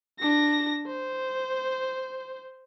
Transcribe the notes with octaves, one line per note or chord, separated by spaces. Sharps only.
D4 A#6
C5